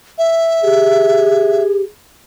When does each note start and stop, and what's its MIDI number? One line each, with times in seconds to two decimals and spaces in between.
0.18 1.63 76
0.64 1.83 67
0.64 1.88 68